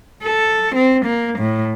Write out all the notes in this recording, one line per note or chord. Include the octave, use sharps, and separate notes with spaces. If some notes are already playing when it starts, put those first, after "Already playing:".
A4
C4
A#3
A2